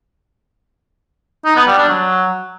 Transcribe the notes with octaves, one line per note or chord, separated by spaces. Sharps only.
D#4
B3
G3
D4
F#3